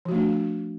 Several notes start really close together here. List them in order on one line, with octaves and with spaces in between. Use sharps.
F3 F#4 A3 D4